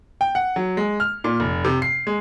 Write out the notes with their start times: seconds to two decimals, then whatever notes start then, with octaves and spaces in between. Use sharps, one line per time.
0.21 G5
0.35 F#5
0.56 F#3
0.77 G#3
1.00 F6
1.24 A#2
1.40 F1
1.65 C3
1.82 C7
2.07 G#3